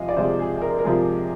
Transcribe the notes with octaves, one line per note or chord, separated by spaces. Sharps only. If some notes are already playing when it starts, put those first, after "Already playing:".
Already playing: C3 F3 G#3 D#5 F5
D5
C3 F3 G#3 C5
G#4
G#4
A#4
A#4
C3 F3 G#3 G#4